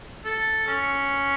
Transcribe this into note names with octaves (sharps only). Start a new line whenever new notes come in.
A4
C#4